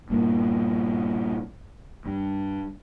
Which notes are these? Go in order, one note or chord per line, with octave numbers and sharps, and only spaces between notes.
G2 A#2
G2